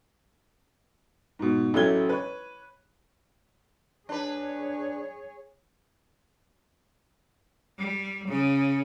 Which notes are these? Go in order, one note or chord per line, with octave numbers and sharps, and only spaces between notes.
G#2 B2
A1 F#3 A3 C#4 G#6 G7
B4 C#5
D4 G#4 B4 C#5
G3
C#3